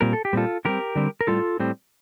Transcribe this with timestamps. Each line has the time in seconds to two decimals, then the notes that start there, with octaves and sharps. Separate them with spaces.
0.01 A#2 G3 C4 A#4
0.13 A4
0.25 G4
0.33 A#2 G3 C4 F4 A4
0.65 D3 G3 C4 G4 A#4
0.95 D3 G3 C4
1.21 A#4
1.27 A2 G3 C4 F4 A4
1.60 A2 G3 C4